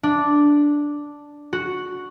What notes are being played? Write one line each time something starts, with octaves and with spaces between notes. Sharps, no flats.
D4
F#4